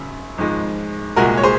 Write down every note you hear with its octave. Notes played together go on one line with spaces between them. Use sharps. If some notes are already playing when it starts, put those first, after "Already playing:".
Already playing: G#1 F#2 C#3 F#3
G#1 G#2 F3 G#3
C2 A#2 G#3 F#4 A#4
C#5
G#4 C5